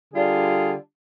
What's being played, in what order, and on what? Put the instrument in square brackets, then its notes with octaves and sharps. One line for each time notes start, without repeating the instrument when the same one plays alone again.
[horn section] D3 G3 D4 F4 G#4